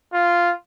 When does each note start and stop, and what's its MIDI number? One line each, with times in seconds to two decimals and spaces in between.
0.13 0.52 65